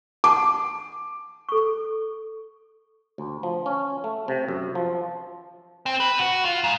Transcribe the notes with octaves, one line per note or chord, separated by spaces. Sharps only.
F#5 G#5 A5 D6
A4 C#6
D2
F3
C#4
A3
C3
F#2
F3
C4
B4
F#4
F4
G#2